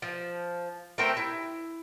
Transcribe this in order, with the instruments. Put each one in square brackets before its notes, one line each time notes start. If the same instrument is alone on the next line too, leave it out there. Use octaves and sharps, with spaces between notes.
[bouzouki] F3
A3 C4 A#4 G5
E4